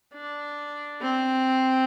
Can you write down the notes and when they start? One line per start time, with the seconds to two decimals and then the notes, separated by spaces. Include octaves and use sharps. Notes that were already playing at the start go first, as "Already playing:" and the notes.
0.14 D4
1.01 C4